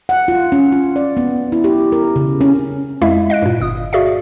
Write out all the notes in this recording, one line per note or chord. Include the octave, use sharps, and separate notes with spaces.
F#5
F4
C#4
F4
D5
B3
E4
G4
A#4
C#3
C#4
F2 G#3 E4 E5 F5
D#5 F5 F#6 D7
G2 A#2
G1 D#6
F#4 G#4 D5 E5 F5